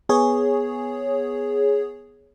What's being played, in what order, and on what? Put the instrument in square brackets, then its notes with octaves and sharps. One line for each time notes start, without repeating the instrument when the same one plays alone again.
[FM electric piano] B3 G#4 C#5